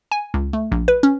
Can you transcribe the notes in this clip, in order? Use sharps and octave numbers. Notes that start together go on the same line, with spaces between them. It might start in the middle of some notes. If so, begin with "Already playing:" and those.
G#5
C#2
A3
A#1
B4
C#4